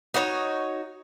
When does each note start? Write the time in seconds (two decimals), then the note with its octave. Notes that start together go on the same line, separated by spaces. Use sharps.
0.14 D#4 F#4 C5 C#5